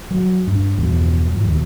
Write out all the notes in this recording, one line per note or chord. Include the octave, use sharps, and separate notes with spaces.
F#3
G2 D4
E2 G2 B2 F3
G#2 F3
D#2 B2